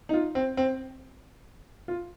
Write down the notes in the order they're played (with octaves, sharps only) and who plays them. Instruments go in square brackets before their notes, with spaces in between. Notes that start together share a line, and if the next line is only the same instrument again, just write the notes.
[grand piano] D#4
F4
C4
C4
F4